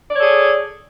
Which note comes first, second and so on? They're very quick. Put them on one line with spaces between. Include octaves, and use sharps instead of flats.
D5 C#5 A4 G#4